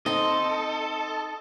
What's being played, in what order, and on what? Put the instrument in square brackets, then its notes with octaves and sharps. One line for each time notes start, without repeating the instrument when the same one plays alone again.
[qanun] C4 G5 C6 [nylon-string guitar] D#4 [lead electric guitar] A4 [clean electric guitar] D#5